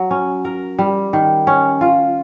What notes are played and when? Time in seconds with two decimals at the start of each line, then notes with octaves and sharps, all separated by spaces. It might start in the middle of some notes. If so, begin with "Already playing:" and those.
Already playing: F#3
0.11 C#4
0.45 A#4
0.79 G3
1.13 D#3
1.47 C#4
1.81 F4